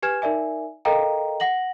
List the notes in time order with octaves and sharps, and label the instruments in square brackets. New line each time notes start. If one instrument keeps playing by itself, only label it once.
[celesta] G4 B4 G#5 F6 G#6 E7
D#4 A#4 D5 E5 G#5
A4 A#4 D#5 F5 G5 A#5
F#5 A#6 F#7